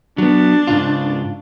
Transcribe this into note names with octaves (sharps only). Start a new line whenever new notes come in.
F#3 B3 D4
G#2 C#3 F4